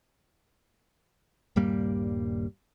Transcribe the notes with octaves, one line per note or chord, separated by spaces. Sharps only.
D#1 G2 G3 A#3